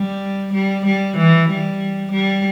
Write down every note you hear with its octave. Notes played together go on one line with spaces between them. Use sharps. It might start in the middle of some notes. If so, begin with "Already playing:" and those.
Already playing: G3
G3
G3
E3
G3
G3